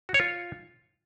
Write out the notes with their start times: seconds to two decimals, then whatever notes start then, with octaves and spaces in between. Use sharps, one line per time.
0.09 F#4
0.14 C#5
0.20 F4